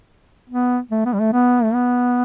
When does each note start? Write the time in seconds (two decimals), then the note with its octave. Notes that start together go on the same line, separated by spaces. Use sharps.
0.50 B3
0.91 A3
1.06 B3
1.13 G3
1.20 A3
1.33 B3
1.63 A3
1.74 B3